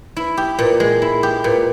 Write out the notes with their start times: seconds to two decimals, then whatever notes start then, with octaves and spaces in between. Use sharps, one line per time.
0.17 E4
0.37 G4
0.59 A#2
0.80 G#3
1.02 E4
1.23 G4
1.44 A#2